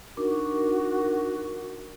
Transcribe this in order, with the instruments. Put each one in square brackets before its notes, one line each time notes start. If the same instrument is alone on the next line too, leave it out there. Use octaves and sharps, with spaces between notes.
[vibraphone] D4 D#4 A#4 [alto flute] F#4